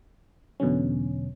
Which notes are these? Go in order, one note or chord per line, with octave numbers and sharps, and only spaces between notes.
E2 B2 D3 F#3 C#4